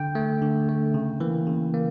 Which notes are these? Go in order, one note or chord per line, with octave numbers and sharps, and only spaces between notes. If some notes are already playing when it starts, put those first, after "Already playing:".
Already playing: D3 G5
A3
D3
A3
C#3
E3 A#3
C#3
A#3